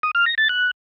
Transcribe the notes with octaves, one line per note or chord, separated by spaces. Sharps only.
D#6
F6
A#6
A6
F#6